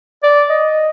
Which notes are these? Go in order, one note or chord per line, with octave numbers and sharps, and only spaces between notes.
D5
D#5